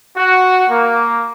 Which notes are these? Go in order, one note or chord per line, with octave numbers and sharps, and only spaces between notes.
F#4
A#3